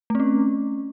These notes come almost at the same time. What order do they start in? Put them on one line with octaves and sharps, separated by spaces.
A3 C4 C#4